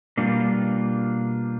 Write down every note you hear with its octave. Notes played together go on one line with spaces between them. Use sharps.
B2 G3 A#3 D4 F4